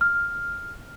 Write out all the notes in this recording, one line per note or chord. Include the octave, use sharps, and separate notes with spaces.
F6